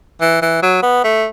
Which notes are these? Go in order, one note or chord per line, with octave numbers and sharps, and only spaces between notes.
E3
E3
F#3
B3
A3